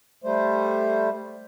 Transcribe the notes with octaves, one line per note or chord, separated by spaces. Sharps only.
G3 A3 C5